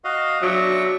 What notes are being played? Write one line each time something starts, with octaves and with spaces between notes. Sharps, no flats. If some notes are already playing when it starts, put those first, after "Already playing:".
F#4 D#5 F5
F#3 D4 E5 C#6